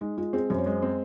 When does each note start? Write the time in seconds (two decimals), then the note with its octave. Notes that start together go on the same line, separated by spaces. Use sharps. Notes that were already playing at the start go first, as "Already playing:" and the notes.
0.01 G#3 D#4
0.17 G#3 F4
0.33 C4 G#4
0.50 F#2 C5
0.58 C#5
0.66 G#3 C5
0.82 C4